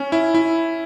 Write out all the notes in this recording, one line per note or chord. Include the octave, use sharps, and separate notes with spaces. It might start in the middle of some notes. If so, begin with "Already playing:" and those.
Already playing: C#4
E4
E4